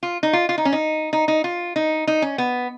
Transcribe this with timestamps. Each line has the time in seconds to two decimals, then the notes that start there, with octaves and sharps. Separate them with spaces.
0.03 F4
0.23 D#4
0.33 F4
0.49 F4
0.58 D#4
0.65 C#4
0.72 D#4
1.13 D#4
1.28 D#4
1.44 F4
1.76 D#4
2.07 D#4
2.22 C#4
2.38 B3